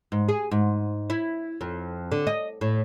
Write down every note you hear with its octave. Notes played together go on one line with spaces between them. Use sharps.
G#2
G#4
G#2
E4
F2
D3
D#5
A2